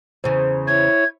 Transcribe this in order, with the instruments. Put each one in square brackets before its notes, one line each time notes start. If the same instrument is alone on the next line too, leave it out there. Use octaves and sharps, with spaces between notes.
[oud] E2 C#3 [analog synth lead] C5
[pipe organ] E4 C#5 [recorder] G#6